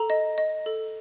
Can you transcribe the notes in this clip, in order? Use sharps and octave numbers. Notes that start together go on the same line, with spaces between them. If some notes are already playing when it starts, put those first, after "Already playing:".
Already playing: A4 A#5
D#5
D#5
A4